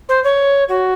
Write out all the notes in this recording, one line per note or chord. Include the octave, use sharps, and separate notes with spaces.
C5
C#5
F#4